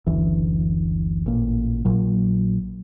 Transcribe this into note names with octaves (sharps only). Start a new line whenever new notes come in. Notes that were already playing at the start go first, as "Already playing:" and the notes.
F#1 D2 E3
A1 A#2
A#1 A#2 F#3